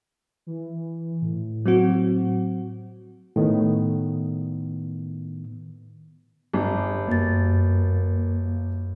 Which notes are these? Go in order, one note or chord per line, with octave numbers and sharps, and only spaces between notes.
E3
A2
F#3 C4 F#4
A2 D#3 B3
G1
F#2 A#3 A6